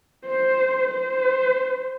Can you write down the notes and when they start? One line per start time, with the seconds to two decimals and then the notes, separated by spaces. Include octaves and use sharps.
0.26 C5
0.91 C5